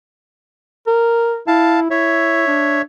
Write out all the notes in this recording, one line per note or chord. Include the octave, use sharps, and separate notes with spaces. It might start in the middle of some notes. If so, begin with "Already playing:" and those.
A#4
E4 F5 A5
E4 C#5 E5
D4